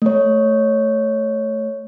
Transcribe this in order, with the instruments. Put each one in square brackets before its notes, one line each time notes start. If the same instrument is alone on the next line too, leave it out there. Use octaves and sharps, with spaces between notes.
[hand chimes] A3 C#5